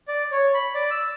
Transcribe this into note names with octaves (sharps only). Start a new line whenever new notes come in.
D5
C#5
B5
D5
E6